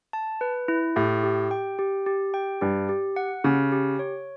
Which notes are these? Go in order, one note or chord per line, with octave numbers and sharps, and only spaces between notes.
A5
B4
E4
A2 G4
G4
G5
G4
G4
G5
G2 G4
G4
F#5
C#3 G4
G4
C#5